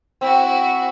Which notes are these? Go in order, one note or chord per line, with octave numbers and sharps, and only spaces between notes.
C4 E4 F#4